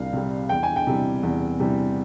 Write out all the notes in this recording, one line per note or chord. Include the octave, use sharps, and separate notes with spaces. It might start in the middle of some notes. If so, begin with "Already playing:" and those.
Already playing: C2 C3 G3 F5
C3 G3
E2 G5
G#5
G5
C3 E3 G3
E2
C3 E3 G3